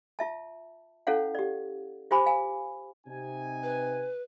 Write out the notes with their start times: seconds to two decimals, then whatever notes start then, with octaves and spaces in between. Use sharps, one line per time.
0.19 F4 E5 A5
1.07 C#4 E4 A4 C#5 F5 F#5
1.35 G4 D5
2.11 F4 G4 C5 G#5 B5 D6
2.26 F5 G#5
3.07 C3 D#4 G#5
3.63 B4